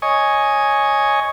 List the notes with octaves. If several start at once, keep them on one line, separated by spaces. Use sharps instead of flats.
C#5 D#5 G#5